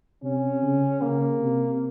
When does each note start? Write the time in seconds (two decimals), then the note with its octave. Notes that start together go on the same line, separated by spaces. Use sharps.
0.23 C3 C#4
0.62 C#3
1.02 C#3 A#3
1.40 C3